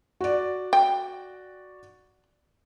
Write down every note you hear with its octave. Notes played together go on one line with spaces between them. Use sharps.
F#4 D5
G5